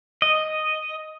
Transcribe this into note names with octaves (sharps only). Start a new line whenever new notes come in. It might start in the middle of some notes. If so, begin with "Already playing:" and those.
D#5